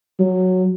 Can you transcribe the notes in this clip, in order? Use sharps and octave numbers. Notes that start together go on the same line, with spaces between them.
F#3